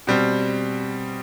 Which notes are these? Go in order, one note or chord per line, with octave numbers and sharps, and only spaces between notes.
B2 G3 C4